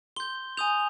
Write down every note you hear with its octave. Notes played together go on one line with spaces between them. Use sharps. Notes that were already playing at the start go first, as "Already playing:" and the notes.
C6 G6 G7
G#5 D#6 G6 F7